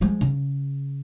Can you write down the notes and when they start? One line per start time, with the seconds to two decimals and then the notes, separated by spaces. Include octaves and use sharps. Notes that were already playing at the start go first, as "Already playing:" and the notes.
0.01 F3 G#3
0.21 C#3